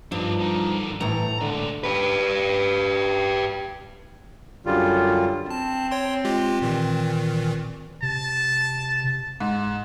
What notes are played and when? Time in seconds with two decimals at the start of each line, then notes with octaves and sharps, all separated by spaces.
0.12 G2 F3 D4 D#4
0.40 D3 D#4
1.01 D2 A2 E3 A#5
1.41 D3 G#3 D4
1.84 G4 B4
4.66 F#2 D3 G3 F4
5.51 C4 A5
5.91 C#5 G5 C6
6.25 G#3 F4 G4
6.62 A#2 D#3 E3
8.02 C3 A5
9.40 G#2